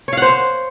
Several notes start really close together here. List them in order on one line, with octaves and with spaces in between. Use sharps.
C#5 F5 F#5 C5